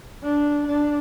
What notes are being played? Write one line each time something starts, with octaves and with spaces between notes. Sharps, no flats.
D4
D4